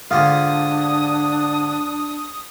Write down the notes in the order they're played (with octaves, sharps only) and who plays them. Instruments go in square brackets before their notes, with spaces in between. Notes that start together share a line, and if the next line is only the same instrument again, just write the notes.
[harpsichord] G#2 D3 G4 [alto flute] D4 [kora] F4 [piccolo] D#6